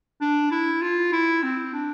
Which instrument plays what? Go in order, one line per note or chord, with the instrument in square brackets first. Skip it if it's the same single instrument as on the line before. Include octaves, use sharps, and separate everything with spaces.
[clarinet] D4
E4
F4
E4
C4
D4